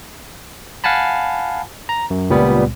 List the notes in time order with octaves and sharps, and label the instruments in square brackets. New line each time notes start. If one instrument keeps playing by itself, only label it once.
[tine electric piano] F5 F#5 G#5 A5 B5
A#5
F#2
C#2 A#2 G3 B3